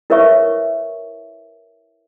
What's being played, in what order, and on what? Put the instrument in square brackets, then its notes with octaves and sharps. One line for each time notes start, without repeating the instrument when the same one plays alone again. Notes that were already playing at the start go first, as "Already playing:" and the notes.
[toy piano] E4 A#4 B4 C#5 E5 C#6